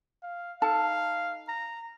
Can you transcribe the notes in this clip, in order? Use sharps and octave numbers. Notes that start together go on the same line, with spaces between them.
F5
D#4 A4 F5 A5
A#5